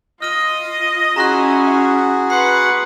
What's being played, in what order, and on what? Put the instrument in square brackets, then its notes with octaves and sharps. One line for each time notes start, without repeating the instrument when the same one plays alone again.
[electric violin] F4 [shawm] D#5 [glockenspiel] F6 D#7
[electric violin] C#4 E4 [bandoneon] F#4 G#4 [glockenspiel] A#5 C6 F#6
[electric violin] B4 [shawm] F#5 [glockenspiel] C6 C7